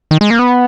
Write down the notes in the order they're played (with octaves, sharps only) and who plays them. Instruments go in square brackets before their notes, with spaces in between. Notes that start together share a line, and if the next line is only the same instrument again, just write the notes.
[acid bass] D#3
G#3
A#3
B3